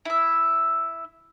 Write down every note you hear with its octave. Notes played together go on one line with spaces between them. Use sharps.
E4 E5